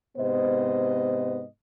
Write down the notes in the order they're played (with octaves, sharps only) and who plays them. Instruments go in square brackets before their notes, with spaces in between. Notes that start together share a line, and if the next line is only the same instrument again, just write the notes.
[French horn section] G#2 C3 B3 C5 D#5